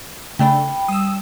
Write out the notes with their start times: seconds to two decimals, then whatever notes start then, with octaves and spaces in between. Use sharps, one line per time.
0.39 C#3 A3 D4 G5 B5
0.88 G3 D#6 E6